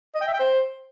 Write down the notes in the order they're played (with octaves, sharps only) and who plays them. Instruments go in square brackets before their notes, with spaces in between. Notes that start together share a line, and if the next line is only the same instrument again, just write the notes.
[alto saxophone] D#5
G5
E5
G5
C5